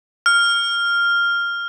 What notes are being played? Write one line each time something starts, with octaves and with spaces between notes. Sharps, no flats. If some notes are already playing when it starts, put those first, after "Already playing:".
F6